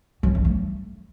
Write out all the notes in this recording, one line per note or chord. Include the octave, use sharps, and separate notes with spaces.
F#3
G3
A3